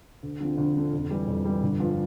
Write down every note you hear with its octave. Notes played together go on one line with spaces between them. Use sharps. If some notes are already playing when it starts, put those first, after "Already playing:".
D2
D3 F3 C4
D2
D3 F3 C4
F2
E3 G3
F2
E3 G3
G1
G2 F3